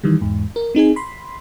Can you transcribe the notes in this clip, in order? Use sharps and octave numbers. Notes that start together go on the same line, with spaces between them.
D#3 E3 G3
E2 G#2
A#4
C4 D#4 G#4 G#5
B5 C6